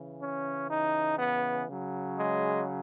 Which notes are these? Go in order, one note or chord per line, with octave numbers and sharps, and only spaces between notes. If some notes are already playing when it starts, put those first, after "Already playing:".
Already playing: C#3 E3
C#4
D#4
B3
C#3 F#3
G#3